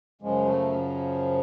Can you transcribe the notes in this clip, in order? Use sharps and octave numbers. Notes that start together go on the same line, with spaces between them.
F#2 C#3 F3 G#3
A3